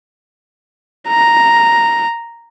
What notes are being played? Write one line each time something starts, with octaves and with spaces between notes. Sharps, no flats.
A#5